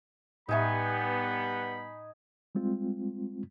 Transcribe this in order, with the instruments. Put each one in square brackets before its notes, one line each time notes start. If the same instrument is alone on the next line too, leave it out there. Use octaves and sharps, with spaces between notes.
[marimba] A2 E5 [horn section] G3 B3 [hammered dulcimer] D#4 G#5 C#6 [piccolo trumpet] B5
[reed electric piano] G3 G#3 C4 F4